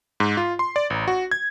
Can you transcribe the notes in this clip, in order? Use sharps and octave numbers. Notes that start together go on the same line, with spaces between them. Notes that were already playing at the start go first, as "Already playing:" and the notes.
G#2
F4
C6
D5
A1
F#4
G#6